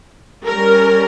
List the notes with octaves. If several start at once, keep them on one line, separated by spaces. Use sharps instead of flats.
G3 C#4 A#4